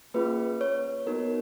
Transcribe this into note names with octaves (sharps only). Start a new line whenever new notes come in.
A#3 C#4 F4 G#4 B4
C#5
B3 D#4 F#4 A#4